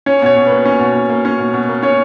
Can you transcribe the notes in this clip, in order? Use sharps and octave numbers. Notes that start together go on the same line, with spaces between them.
C#4 C#5
B2 C#5
B2
A#3 B4
C#4
B2
B2
A#3
C#4
B2
B2
A#3
C#4 C#5